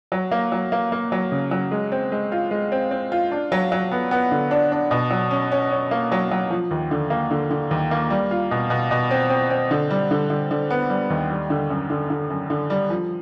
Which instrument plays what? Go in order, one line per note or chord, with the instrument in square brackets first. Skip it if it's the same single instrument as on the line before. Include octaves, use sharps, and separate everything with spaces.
[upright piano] F#3
A#3
F#3
A#3
A#3
F#3
C#3
F#3
G#3
C4
G#3
F4
G#3
C4
C4
F4
D4
F#3
F#3
B3
B3
D3
D4
D4
B2
F#3
C#4
C#4
C#4
A#3
F#3
F#3
F3
D#2
D3
A#3
D3
D3
D#2
A#3
G3
F4
B2
B2
B2
C4
C4
C4
D3
G3
D3
D3
D3
B3
G3
D#2
G3
D3
F#2
D3
D3
F#2
D3
G3
F3